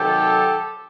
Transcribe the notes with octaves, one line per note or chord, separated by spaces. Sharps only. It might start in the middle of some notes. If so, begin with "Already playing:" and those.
Already playing: C3 D#3 F#3 G4 A4